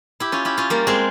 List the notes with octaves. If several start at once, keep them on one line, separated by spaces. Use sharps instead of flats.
E4 G4
C#4 F4
E4 G4
C#4 F4
G3 A#3
G#3 C4